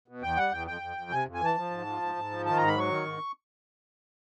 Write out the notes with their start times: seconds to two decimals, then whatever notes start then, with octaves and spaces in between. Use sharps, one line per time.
0.08 B2
0.22 E2 G5
0.37 G3 F#5
0.52 E2 G5
0.67 F2 G5
0.81 F2
0.97 F2
1.11 C3 G#5
1.26 F2
1.34 G#5
1.41 E3 A5
1.57 F3
1.71 G#2
1.87 F3
2.02 G#2
2.16 G#2
2.31 F3
2.46 D#3 A5
2.57 G#2 A#5
2.68 B5
2.76 F#3 C#6
2.90 D#3
3.05 G#2